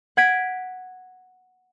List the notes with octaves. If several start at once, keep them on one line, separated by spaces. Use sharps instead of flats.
F#5 G#6 B6 D7